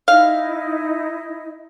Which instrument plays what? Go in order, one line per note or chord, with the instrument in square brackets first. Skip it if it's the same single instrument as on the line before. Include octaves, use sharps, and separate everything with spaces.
[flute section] D#4 E4 D#5 [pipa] F5